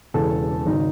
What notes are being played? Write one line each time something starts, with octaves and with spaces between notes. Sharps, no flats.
E1 E2 C#3 E3 A4
G#1 C#3 D#4